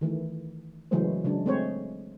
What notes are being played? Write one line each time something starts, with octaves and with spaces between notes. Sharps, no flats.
D#3 E3 A3
C#3 E3 F#3 G#3 A3 C5
C#3 F#3 G#3 D4
G#3 A3 C4 C5 C#5